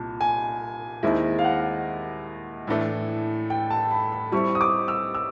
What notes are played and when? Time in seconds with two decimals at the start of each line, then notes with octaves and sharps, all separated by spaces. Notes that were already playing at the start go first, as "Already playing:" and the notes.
Already playing: C2 A#2 A5
0.21 G#5
1.03 D#2 D#3 G#3 C4 E4
1.39 F5
1.44 F#5
2.67 A2 E3 A3 D4
3.50 G5
3.70 A5
3.91 B5
4.12 B5
4.32 G3 C4 E4 C#6
4.55 D#6
4.61 D6
4.88 E6
5.14 E6